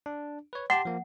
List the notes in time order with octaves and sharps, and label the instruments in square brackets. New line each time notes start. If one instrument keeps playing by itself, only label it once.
[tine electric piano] D4
B4 C#5
[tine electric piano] G4 A5 C6 [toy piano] F#5
[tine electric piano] F3 A#3